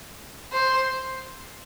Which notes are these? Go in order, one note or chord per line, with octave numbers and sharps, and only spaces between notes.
C5